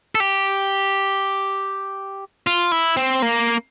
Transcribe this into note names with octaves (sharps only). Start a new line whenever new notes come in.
A4
G4
F4
E4
C4
A#3